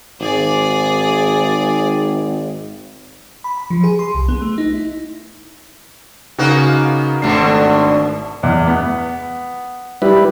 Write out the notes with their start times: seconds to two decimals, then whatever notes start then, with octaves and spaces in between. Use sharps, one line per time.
0.20 G#1 G#4 D5
3.44 B5
3.57 B5
3.70 F3
3.84 G#4
3.99 C6
4.15 C2
4.29 B3
4.42 A3
4.58 D#4
4.73 E4
6.38 C#3 A#3 B3 D#4 F#4 F#6
7.22 G#1 B2 D3 A3 D4 C7
8.43 E2
8.67 B3
10.02 G3 E4 B4